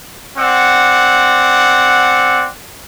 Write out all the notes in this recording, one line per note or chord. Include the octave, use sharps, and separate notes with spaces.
C4 D5 F#5